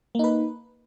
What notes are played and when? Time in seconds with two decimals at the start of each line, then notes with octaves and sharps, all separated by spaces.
0.15 A#3
0.19 D#4
0.24 B4